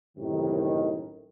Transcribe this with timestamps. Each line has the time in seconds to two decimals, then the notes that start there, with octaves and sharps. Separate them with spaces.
0.17 G1 F#2 A2 C3 D#3